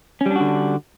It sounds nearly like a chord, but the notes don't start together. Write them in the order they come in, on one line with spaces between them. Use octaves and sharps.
C#4 G3 D4 F#4 D3